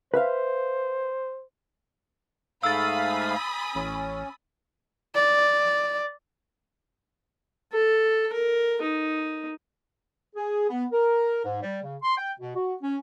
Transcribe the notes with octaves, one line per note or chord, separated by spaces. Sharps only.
B4 C5 E5 F5
G#2 A3 F5 G#5 B5 D#6 E6 A6
A1 C#4
D5
A4
A#4
D#4
G#4
B3
A#4
G#2
G3
C#3
C6
G5
B2
F#4
C#4